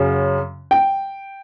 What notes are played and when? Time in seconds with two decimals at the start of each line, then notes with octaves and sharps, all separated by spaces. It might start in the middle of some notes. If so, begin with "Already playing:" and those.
Already playing: F#2 C#3 F#3 C#4
0.71 G5